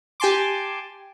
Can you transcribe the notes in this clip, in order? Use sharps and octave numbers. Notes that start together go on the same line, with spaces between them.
G4 G#5 A5 C6 D6